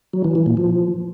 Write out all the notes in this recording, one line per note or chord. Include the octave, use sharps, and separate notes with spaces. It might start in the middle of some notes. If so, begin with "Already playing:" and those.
F#3
E3
E3
A#2
F3